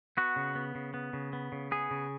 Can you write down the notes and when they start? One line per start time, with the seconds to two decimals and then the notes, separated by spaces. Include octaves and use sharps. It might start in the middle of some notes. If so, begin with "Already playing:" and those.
0.17 B3 F#4
0.36 C#3
0.55 B3
0.75 C#3
0.94 B3
1.13 C#3
1.33 B3
1.52 C#3
1.71 B3 G#4
1.91 C#3